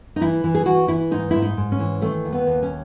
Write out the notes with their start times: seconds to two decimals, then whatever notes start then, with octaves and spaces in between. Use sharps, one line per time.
0.16 D#4
0.21 E3 E4
0.44 E3
0.54 G#4
0.66 E3 F#4
0.88 E3 E4
1.11 G#2 D#4
1.31 G#2 E4
1.42 D#4
1.57 G#2
1.72 C#4
1.79 E3
2.01 D#3 A3
2.25 D#2
2.33 B3
2.47 D#2
2.63 C#4